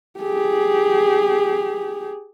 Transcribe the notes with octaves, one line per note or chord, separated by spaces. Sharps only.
G4 G#4